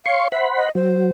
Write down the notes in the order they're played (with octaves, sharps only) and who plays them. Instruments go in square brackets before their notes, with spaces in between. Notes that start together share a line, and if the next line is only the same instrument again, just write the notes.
[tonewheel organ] C#5 C6 C#6 [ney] F5
[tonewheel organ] C5 F#5 B5 [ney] E5
[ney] D#5
[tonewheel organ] F#3 [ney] C5